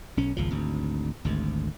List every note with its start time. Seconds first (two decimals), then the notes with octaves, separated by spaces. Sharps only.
0.17 B1 C#4
0.37 G#1 C#2 F3
0.51 G#1 D2
1.25 G#1 D2